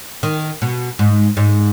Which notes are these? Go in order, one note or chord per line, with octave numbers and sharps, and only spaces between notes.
D#3
B2
G#2
G#2